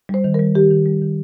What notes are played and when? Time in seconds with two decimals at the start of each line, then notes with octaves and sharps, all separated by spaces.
0.09 G3 C5
0.24 D#3
0.34 A#4
0.39 G3
0.55 D#3 G4
0.71 D#3
0.86 G3
1.01 D#3